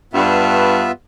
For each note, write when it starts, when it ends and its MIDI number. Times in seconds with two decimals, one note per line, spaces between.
0.13 0.87 43
0.13 0.91 59
0.13 0.91 65
0.13 0.91 76